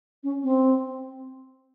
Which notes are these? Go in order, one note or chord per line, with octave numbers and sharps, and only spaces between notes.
C#4
C4